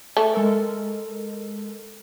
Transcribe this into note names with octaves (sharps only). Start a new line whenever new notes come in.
A3 G#5 A5 C#6
G#3 A4 A#4